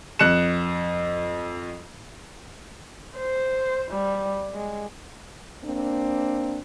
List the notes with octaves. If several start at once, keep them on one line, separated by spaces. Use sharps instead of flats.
F2 F#6 C#7 E7
C5
G3
G#3
A#3 C4 D4